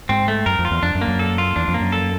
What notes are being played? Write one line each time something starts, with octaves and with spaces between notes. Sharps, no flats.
G#2 C4
A3
F#2 A#4
F2
F4
E2
F2 D4
F#2
A#3
F#2
A4
F4
E2 D4
F2
A#3
F#2
A4